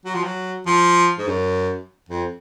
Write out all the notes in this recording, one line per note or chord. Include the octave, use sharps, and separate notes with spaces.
F#3
F3
F#3
F3
G#2
F#2
F2